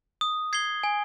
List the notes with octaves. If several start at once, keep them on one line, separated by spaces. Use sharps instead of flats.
D#6
G#6 C7 G7
G#5